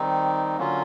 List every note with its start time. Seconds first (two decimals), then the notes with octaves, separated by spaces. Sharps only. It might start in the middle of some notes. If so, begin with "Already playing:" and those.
Already playing: D#3 G3 C4 D#4
0.57 D3 F#3 A#3 C#4 F4